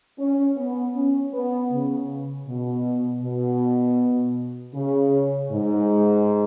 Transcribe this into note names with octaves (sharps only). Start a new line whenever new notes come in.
C#4
B3
C#4
B3
C#3
B2
B2
C#3
G#2